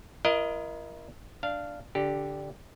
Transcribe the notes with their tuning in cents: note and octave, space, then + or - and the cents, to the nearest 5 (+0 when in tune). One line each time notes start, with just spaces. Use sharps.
E4 +40 A#4 +20 D#5 +0
D4 +0 F5 -10
D3 -10 G4 +0